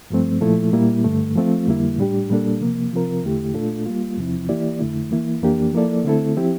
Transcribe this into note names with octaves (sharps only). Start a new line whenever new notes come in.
G2 F3 A3 C4
A#2 F3 A3 E4 A4
A#2 G3 A#3 E4
G2 D3 A3
F3 A3 C4 F4
F2 D3 G3 A#3 E4
A2 G3 D4 G4
A#2 G3 A#3 D4 A4
C3 F3 A#3
C3 F3 C4 F4 A#4
E2 D3 A3 E4 G4
A#2 A3 D4 F4 A4
G3 A#3 F4
E2 C3 F3 C4 E4
E3 A#3 E4 G4 D5
F2 D3 A3 E4
E3 A#3 E4
F2 E3 A#3 D4 G4
F3 A#3 E4 A4 D5
D3 A3 C4 E4 A4
F3 C4 E4 G4